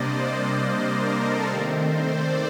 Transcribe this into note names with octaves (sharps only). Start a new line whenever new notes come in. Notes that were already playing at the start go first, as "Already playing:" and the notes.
Already playing: C3 G3 A#3 D4 C5 D5 D#5
C5
A#4
A4
D#3 A3 C4 A#4
C5
D5